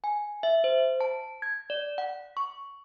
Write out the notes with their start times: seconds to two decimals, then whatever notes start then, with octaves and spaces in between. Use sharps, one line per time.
0.04 G#5
0.43 E5
0.64 C5
1.01 A5
1.42 G#6
1.70 D5
1.98 F#5
2.37 C#6